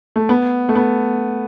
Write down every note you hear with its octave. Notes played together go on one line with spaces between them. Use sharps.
A3
B3
A3
B3